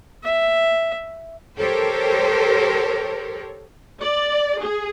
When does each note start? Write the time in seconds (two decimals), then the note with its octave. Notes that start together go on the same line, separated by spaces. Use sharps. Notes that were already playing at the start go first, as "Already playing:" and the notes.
0.24 E5
1.58 G4 A4 A#4 C5 C#5
4.01 D5
4.60 G#4